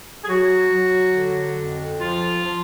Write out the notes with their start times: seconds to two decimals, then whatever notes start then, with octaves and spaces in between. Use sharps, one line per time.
0.23 G#4
0.28 F#3 F#4
0.71 F#3
1.14 D3
1.57 F2
1.99 F3 F4
2.42 F3